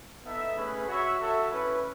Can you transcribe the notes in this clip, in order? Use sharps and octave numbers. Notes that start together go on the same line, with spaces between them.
B3 D#4 A4 E5
A3 C#4 G#4 B4
F#4 C#5 E5
F#4 A4 E5
C#4 E4 B4